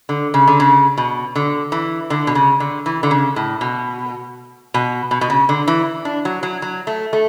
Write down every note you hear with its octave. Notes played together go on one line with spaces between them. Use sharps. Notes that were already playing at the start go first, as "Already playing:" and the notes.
D3
C#3
D3
C#3
B2
D3
E3
D3
B2
C#3
D3
E3
D3
C#3
A2
B2
B2
B2
B2
C#3
D3
E3
D4
F#3
F#3
F#3
A3
A3